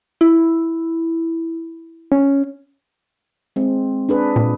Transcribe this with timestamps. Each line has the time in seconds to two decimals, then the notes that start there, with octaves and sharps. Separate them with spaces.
0.21 E4
2.12 C#4
3.56 G#3 C4
4.09 D4 G#4 B4
4.36 A#2